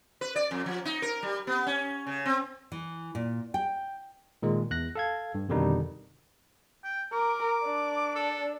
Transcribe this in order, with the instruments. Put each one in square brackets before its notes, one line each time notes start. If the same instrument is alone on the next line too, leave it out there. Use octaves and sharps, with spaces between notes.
[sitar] B4
D5
F2
F3
D#4
A#4
G3
B3
C#4
C#3
C4
[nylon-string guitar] E3
A#2
G5
[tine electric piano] A#2 D#3 G#3
E2 F#6 A#6
A4 F5 G#6
G2
F2 B2 D3 D#3 G3 D#4
[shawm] G5
[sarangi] A#4 [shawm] D6
[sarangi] D4
[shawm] A4